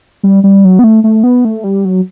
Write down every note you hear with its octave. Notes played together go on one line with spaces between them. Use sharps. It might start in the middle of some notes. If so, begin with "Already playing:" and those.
G3
G3
F#3
B3
A3
A3
B3
A3
G3
F#3